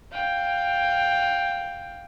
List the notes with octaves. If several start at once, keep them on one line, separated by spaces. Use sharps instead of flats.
F5 G5